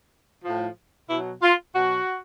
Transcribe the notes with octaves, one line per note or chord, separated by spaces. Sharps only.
A2 F3
B2 F#3 E4
F4
B2 F#3 F#4